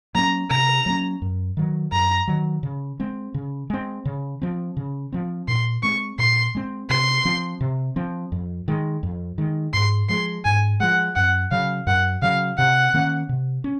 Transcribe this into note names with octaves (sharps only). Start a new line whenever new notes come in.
F#3 A#3 C#4 A#5
C3 A#5
F#3 A#3 C#4
F#2
D#3 F#3
F#2 A#5
D#3 F#3
C#3
G#3 C4
C#3
G#3 C4
C#3
F3 C4
C#3
F3 C4
A#2 C6
G#3 C4 C#6
A#2 C6
G#3 C4
C3 C6
F3 C4
C3
F3 C4
F2
D#3 G#3
F2
D#3 G#3
G#2 C6
F3 G#3 C6
G#2 G#5
F3 G#3 F#5
F#2 F#5
C#3 F#3 F5
F#2 F#5
C#3 F#3 F5
C3 F#5
D#3 A#3 C#4
C3
C#4